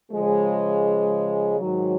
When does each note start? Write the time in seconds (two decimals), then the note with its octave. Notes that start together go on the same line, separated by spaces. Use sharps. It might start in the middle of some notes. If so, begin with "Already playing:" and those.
0.12 C#3 F3 G#3
1.59 G#2 D#3 F#3